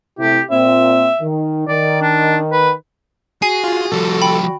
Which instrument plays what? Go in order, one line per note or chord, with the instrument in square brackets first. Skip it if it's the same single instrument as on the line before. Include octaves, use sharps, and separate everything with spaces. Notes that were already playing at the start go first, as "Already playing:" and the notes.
[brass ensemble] C3 A3 E4 [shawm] G4
[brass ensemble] A#2 C4 [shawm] E5
[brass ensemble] D#3
[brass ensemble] D#3 [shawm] D5
[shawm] D4
B4
[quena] F#4 [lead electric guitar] G#4 [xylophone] G#5 C7
[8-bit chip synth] F4
[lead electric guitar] F3 G3 [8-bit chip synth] A4
[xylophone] G5 B5